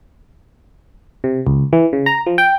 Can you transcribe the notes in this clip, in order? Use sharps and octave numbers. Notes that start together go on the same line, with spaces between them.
C3
C#2
E3
C#3
A#5
F3
G5